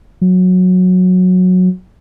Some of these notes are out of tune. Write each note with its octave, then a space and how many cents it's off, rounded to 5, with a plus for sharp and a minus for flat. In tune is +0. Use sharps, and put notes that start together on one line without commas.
F#3 -15